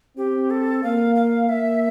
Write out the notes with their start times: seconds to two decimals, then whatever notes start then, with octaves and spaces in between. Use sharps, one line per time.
0.17 C4 G4
0.50 A4
0.83 A#3 F5
1.15 F5
1.49 A#3 E5